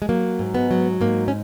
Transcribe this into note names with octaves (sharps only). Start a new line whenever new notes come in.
G#3
F#3 A#3
G#2
G#3 B3
F#3
G#2 A#3
C#4